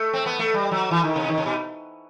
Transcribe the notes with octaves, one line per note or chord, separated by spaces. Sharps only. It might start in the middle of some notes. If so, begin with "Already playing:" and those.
Already playing: A3
C4
B3
A3
G3
F#3
E3
D#3
C3
D#3
C3
B2